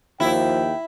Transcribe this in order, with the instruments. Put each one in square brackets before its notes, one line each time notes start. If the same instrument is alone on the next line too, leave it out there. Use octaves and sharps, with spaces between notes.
[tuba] D#2 [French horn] F3 [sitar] E4 [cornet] G5